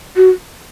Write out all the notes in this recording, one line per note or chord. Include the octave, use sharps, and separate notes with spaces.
F#4